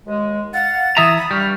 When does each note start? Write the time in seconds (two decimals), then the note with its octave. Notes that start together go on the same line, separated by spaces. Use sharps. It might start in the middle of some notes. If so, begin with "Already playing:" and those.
0.06 D#2 G#3
0.54 F5 F#5 A6
0.97 E3 E5 A#5 D#6
1.18 B5
1.31 G2 G3 C#6 F6